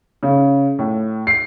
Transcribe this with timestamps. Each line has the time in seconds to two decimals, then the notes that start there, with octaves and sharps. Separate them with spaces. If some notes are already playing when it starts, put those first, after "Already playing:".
0.23 C#3
0.79 A2
1.27 C7